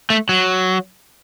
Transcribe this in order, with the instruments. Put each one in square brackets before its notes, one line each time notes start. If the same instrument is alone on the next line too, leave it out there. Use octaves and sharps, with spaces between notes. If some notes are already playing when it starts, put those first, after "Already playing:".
[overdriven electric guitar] A3
F#3